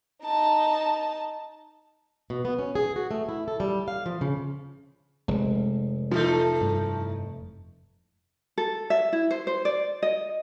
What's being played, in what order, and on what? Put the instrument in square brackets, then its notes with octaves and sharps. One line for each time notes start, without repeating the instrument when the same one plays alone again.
[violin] D#4 A5
[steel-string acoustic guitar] B2
B3
C#4
G#4
F#4
A3
E4
A4
G3
F5
F3
C#3
[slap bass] F1 [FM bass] G#3
[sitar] E3 A3 D#4 [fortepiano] F3
[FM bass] G2
[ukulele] A4
E5
E4
C5
C5
D5
D#5